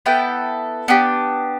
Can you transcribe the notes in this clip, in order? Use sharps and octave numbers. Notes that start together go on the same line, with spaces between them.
B3 E4 A4 G5
B3 D4 G4